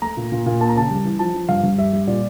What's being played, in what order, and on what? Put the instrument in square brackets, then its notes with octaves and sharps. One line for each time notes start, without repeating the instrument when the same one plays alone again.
[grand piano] A3 A#5
A#2
A#2
A#2
A#3 A5
A#5
C#3 A5
G3
E3
F3 A5
F3
G2 F5
G2
G3 E5
G3
A#2 D5